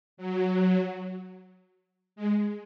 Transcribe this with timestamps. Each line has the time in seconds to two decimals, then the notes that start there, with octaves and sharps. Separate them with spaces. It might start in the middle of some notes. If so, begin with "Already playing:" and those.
0.17 F#3
2.16 G#3